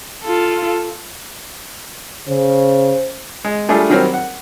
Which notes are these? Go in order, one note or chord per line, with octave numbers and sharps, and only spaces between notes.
F4 A4
C#3 C5
G#3
G3 A3 D4 F4 G#4
D#3 F#3 G3 C4 A#4
F#5